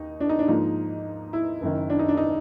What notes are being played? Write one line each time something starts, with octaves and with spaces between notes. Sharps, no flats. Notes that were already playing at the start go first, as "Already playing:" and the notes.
Already playing: D#2 D#4
D4
D#4
D4
G#2 F3 A#3 D#4
E4
F#1 F#2 D#3
D4
D#4
D4
D#4